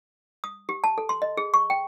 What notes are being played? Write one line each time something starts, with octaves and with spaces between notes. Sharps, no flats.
D#6
G4
A5
A4
C6
D#5
G#4
C#6
G5